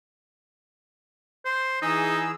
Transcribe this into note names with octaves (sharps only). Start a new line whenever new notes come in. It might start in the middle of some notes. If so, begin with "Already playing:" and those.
C5
E3 D#4 G#4 E6